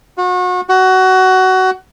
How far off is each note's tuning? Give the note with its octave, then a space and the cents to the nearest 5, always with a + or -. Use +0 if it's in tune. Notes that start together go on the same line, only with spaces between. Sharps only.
F#4 -35
F#4 +20